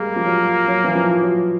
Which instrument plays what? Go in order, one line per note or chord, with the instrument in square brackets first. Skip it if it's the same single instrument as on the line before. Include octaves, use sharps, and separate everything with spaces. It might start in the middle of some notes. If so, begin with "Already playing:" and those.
Already playing: [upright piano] G3 G#3 [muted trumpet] A#3
[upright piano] F3
F#3
F#3
E3
F3
F#3